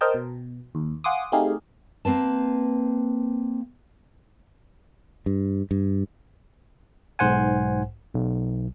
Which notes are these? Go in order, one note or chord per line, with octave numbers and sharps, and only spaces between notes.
A#4 C5 D#5 G5 A5
B2
D#2
F5 F#5 G#5 C6 D6 D#6
A3 C4 D#4 G4 G#4 F5
A#3 C4 B4 A5
G2
G2
B1 G#2 C5 F#5 G#5
B1